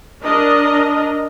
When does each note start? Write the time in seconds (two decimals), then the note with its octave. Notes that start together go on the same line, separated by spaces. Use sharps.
0.23 D4 A#4 D#5